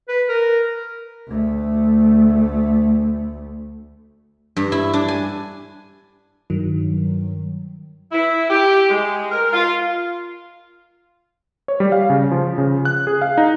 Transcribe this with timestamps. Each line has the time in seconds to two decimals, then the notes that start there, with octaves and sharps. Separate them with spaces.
0.09 B4
0.29 A#4
1.28 D2 A3
4.57 G2
4.72 E4
4.93 D4
5.08 G#5
6.50 G2 D#3 F#3
8.12 E4
8.50 G4
8.90 G#3
9.31 A#4
9.53 F4
11.68 C#5
11.80 G3
11.92 F5
12.10 C#3
12.31 F3
12.58 C#3
12.85 F#6
13.07 G#4
13.22 F5
13.38 D#4